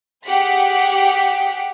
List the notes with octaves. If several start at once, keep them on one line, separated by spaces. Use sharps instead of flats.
G4 G#4 F#5 B6